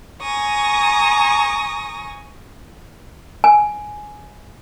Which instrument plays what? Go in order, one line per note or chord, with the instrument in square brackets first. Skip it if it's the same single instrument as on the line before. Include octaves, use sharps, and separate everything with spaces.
[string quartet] G#5 A#5 C#6 D#6
[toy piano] G#5